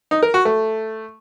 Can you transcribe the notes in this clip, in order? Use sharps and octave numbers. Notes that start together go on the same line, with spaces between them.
D#4
A#4
F#4
A3